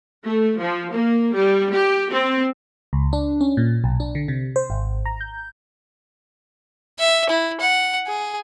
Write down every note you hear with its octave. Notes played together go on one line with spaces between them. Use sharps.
A3
F3
A#3
G3
G4
C4
C#2
D4
C#4
A#2
B1
D4
D3
C3
C5
G#1
A#5
G6
E5
E4
F#5
G#4